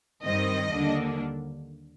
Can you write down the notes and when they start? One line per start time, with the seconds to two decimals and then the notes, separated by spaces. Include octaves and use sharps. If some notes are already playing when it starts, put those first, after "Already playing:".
0.24 G2 D#3 G3 C4 D#5
0.71 D#2 D3 G3 A#3 D4